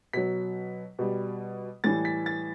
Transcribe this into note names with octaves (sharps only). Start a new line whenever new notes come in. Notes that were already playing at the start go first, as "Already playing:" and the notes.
B2 F#3 B6
B2 G3
A2 E3 G3 A6
B6
A6